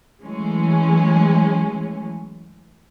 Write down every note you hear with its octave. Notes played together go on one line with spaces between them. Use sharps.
E3 F#3 G#3 A3 C#4